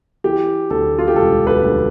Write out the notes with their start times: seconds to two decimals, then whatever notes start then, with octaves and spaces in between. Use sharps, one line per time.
0.24 E3 G4
0.70 D2 A4
0.98 F4
1.08 G4
1.16 E1 A4
1.47 B4
1.62 D2